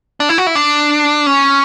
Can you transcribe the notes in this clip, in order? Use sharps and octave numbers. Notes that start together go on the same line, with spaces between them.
D4
E4
F#4
E4
D4
C#4